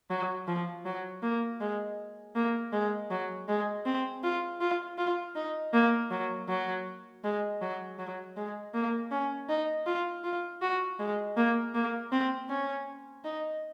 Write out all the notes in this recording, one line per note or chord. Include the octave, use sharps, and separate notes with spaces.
F#3
F3
F#3
A#3
G#3
A#3
G#3
F#3
G#3
C4
F4
F4
F4
D#4
A#3
F#3
F#3
G#3
F#3
F#3
G#3
A#3
C#4
D#4
F4
F4
F#4
G#3
A#3
A#3
C4
C#4
D#4